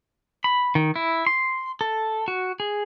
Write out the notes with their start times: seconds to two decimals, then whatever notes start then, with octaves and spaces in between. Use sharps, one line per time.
0.44 B5
0.75 D#3
0.96 E4
1.27 C6
1.81 A4
2.28 F#4
2.60 G#4